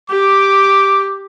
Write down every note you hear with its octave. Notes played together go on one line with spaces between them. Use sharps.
G4 D6